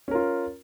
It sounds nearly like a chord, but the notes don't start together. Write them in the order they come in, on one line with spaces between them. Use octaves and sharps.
C#4 A#4 F4